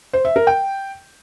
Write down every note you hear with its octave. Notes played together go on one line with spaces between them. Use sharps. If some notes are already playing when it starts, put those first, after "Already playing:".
C5
E5
A#4
G5